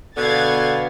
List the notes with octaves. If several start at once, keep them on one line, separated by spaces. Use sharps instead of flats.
B2 D3 B3 F5 G#6 A6